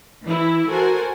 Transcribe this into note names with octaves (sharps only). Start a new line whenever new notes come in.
E3 E4
F#4 A4 A#4 C5 G#5